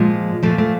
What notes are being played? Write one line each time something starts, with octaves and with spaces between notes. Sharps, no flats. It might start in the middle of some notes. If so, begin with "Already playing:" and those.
Already playing: A#2 F3 G#3
A#2 F3 A3
A3